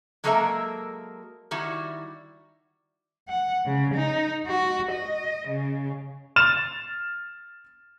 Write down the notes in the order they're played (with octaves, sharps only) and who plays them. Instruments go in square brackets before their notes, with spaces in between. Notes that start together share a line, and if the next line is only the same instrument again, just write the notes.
[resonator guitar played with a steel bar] F#3 G#3 A#3 A4 A#4 E5
D#3 G3 E4 F#4
[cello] F#5
C#3
D#4
F#4
D#5
C#3
[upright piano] F6 A6 E7